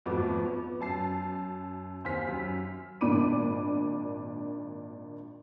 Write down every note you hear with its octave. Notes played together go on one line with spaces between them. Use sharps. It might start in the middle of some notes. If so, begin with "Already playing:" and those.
G#1 F2 A3 B3 F#4 D6
B3
F#2 A5 C7
D#2 C5 G#5 F6 B6
F#2
G#1 A#2 D4 B5 D6 D#7